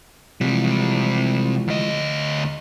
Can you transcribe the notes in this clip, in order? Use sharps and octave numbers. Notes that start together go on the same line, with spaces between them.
C3 E3 F3 G3 G#3
D2 D#5